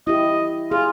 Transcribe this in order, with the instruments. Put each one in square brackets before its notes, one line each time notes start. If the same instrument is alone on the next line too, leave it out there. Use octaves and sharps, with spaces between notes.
[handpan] E4 G4 [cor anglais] D#5
[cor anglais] F4 [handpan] G#4